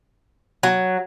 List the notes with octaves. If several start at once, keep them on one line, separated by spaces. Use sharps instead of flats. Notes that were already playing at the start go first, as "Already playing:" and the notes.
F#3